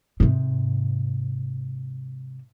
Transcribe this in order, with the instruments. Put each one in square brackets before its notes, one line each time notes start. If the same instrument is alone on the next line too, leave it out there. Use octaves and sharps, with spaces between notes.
[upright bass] G#2 C3